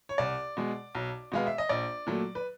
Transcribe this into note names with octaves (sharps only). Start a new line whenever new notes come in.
C#5
C2 D5
B2 G#3
B1
B2 G#3 B3 F5
E5
D#5
A#1 D5
A#2 F#3 A3
B4